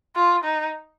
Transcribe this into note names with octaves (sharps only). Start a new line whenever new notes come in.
F4
D#4